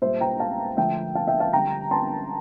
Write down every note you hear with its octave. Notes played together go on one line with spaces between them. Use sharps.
A#2 G3 C5 E5
G5 A#5
F5 A5
D3 F3 A3 E5 G5
F5 A5
E5 G5
F5 A5
D3 G3 G5 A#5
A5 C6